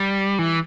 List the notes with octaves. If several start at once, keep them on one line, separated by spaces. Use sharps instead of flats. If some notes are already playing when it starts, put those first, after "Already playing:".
Already playing: G3
E3